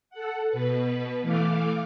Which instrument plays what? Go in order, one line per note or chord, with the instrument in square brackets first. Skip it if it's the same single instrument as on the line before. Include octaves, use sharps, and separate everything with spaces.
[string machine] A4 F#5
B2 B4
E3 A3 F5 D6